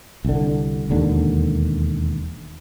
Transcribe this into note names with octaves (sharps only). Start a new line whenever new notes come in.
C2 D3
E1 D#2 D3